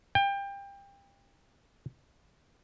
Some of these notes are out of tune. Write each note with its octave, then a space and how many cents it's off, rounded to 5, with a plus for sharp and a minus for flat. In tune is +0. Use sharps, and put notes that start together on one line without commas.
G5 +25